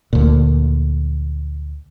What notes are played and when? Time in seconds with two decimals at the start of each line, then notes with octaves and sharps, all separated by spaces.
0.13 D2 A#2